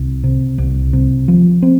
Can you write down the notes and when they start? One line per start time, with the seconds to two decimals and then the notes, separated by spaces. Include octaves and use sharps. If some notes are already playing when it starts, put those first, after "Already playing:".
Already playing: C2
0.24 C3
0.58 C2
0.93 C3
1.28 F3
1.62 C4